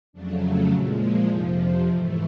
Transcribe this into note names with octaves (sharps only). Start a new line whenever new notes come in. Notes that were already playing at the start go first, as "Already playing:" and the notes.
F2 C#3 F#3 A3 D4
A#2 F3 G#3 E4
E4
F2 C3 F3 D#4
D4
G#2 E3 A3